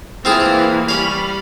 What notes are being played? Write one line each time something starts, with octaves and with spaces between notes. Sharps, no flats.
E3 A#3 C4 E4 F4 G#4
G3 C#4 F5 B5